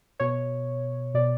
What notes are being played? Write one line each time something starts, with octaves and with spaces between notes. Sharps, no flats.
B2 C#5
B2 D5